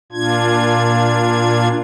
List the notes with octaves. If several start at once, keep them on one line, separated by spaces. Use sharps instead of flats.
A#2 D4 F4 G#6